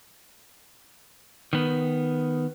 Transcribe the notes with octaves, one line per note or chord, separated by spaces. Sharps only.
D#3 B3